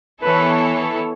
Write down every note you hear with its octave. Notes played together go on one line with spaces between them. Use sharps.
E3 B3 E4 A4 B4 C#5